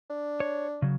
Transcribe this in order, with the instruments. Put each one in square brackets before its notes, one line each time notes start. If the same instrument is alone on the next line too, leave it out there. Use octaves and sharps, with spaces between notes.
[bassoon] D4
[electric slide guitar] C#5
C#3 F#3